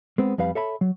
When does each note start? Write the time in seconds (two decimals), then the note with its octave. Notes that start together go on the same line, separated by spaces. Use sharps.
0.18 G#3 B3 C4
0.38 F2 G3 B4 F5
0.55 A4 C#5 E5 A5 B5
0.81 F#3